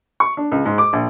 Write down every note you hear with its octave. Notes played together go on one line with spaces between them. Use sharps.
C#6
D4
C#2
G#2
D6
A#1